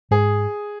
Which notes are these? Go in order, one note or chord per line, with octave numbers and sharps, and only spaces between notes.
G#2 G#4